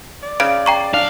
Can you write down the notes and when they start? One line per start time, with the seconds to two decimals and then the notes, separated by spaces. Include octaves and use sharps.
0.23 D5
0.40 C#3 D7
0.66 G5 A#5 C#6
0.94 B1 D4 F5